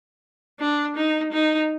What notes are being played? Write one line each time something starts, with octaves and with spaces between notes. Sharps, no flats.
D4
D#4
D#4